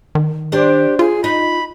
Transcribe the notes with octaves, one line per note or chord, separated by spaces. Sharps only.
D#3
D4 G4 C5
F4 G#4
D#4 B5